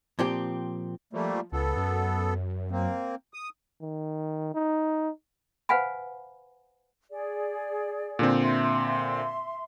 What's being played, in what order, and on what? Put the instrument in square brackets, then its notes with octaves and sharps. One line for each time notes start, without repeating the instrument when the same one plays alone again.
[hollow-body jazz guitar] A#2 F3 C4 G4
[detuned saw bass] F3 [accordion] G3 A3 A#3
[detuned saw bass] C#2 [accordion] B3 A4
[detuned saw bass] F#2
[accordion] A#3 C4
D#6
[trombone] D#3
D#4
[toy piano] B4 C5 F5 F#5 G#5 B5
[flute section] G#4 D5
[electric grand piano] A#2 D3 C4
[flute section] E5 C6